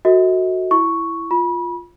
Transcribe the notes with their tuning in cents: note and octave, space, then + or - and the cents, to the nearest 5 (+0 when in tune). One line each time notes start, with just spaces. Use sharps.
F#4 +0 A4 +35 D#5 +45
E4 +10 C#6 +0
F4 +0 B5 -30